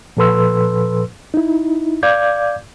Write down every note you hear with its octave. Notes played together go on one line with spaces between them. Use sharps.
A#2 F3 A4 B4 C6 E6
D#4 E4
D5 F5 D6 G6 G#6